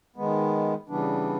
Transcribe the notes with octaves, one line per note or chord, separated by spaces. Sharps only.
D#3 G#3 B3
C#3 E3 G3 B3 D4